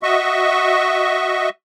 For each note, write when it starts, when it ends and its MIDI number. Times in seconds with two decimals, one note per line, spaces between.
0.03 1.49 66
0.03 1.49 75
0.03 1.49 76
0.03 1.49 85